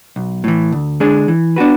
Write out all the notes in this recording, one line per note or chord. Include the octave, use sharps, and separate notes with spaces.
B1
A2 E3
D2
D3 G#3 D4 G#4
E3
B3 D4 F#4 B4